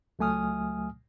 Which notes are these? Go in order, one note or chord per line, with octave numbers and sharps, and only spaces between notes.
C#2 F#3 A3 G#5 D#6 F6